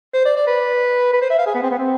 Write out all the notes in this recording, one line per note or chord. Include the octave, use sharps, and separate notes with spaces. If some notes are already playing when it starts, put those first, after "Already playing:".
C5
D5
D5
B4
B4
C5
E5
F5
G#4
B3
C4
B3
C4